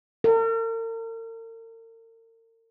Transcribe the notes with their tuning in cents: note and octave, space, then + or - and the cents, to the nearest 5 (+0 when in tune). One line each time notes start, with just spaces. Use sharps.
A#4 -45